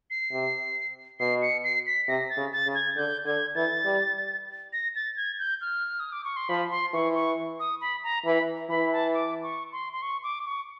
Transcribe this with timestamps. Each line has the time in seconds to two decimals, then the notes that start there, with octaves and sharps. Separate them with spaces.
0.11 C7
0.32 C3
1.20 B2 C7
1.42 C#7
1.64 C7
1.87 B6
2.08 C3 A#6
2.30 A6
2.37 C#3
2.52 A6
2.67 C#3
2.75 G#6
2.96 D3 G6
3.25 D3 G#6
3.55 E3 A6
3.85 G3
4.73 A#6
4.96 A6
5.17 G#6
5.39 G6
5.61 F6
6.00 D#6
6.12 D6
6.24 C#6
6.36 C6
6.49 F3 B5
6.71 C6
6.94 E3 C#6
7.15 C#6
7.60 D#6
7.81 B5
8.04 A#5
8.25 E3 B5
8.70 E3 B5
8.92 A5
9.14 D6
9.43 C#6
9.72 C6
9.93 C6
10.02 C#6
10.23 D6
10.46 C#6